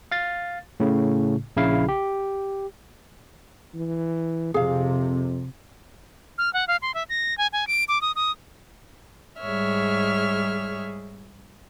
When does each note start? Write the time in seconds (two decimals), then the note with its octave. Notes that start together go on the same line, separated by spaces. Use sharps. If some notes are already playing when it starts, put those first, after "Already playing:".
0.12 F5 A6
0.80 A2 C#3
1.57 A#1 C#3 E4 F5
1.88 G4
3.75 E3
4.54 F2 C3 G#4 F5
6.38 F6
6.54 F#5
6.68 F5
6.82 C6
6.94 E5
7.09 A#6
7.38 G#5
7.53 G#5
7.67 D7
7.88 D6
8.02 D#6
8.16 D#6
9.40 G#2 G3 G#4 C#5 E5 F6